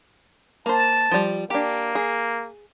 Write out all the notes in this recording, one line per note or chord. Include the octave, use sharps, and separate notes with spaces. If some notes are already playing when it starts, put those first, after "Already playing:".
A#3 C5 A5
F3 G3
A#3 D4 G4
G#4